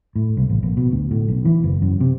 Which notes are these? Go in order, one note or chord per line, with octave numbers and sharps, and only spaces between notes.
A2
C2
A1
A#1
B2
D2
A2
B1
E3
F#1
F#2
C3